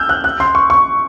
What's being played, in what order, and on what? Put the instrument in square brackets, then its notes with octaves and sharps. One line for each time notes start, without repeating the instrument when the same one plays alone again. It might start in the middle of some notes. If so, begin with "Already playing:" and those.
Already playing: [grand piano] E6 F6 G6
F#6
F#6
C6
C#6
C#6